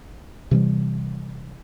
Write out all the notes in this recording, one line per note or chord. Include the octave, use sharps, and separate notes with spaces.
C3 E3 G3